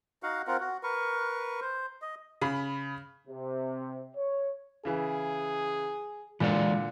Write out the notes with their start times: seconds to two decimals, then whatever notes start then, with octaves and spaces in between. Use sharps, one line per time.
0.23 D#4 F#4 F5 F#5
0.47 C4 F4 A#4 F#5
0.60 F#4
0.83 A#4 B4 C#6
1.61 C5
2.02 D#5
2.42 C#3 B5
3.28 C3
4.16 C#5
4.85 C#3 E3 G#4
6.40 A#2 D3 E3 G#3 D5